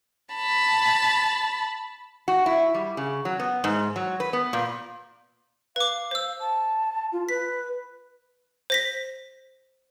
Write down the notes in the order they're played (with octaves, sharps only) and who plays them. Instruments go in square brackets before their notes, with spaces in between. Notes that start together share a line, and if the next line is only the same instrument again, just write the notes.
[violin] A5 B5
[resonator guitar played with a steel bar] F#4
E4
G3
C#3
F#3
B3
G#2
F#3
B4
B3
A#2
[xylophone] B4 D6 [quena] F5
[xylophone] C5 E6
[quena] A5
F4
[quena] B4 [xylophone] B6
[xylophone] C5 A#6 B6